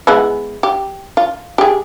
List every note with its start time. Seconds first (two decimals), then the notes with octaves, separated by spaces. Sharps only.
0.07 G#3 B3 E4
0.63 G4
1.17 F4
1.58 G4 G#4